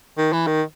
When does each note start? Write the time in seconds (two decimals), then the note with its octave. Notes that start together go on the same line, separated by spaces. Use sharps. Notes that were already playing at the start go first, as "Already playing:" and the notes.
0.18 D#3
0.33 E3
0.47 D#3